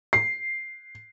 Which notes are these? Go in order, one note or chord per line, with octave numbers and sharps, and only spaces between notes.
C7